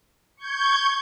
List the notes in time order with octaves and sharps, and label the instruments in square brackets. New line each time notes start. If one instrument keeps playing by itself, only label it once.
[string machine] C#6 G6 G#6